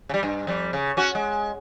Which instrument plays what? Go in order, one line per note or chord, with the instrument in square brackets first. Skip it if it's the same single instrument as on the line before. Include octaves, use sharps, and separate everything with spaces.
[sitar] C#3 G3
G2
F2 G3
C#3
C#4 F#4
G#3